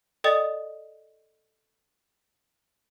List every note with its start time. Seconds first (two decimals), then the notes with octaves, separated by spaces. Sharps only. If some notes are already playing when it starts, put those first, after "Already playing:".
0.24 A4 D5 D#5 G5 D#6 A6